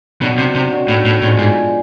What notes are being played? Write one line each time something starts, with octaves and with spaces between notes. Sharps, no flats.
B2 D#3 F#3 B3 D4
C3
C3
D#3 F#3 B3 D4
A2
A2
A2 D3 F3 G#3
G#2